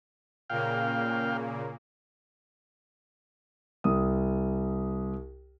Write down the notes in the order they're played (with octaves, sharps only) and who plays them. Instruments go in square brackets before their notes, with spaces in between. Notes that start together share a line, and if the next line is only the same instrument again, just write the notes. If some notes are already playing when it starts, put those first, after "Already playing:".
[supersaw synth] A#2 C#3 A#3 [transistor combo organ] F5 G5
[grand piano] C2 D#6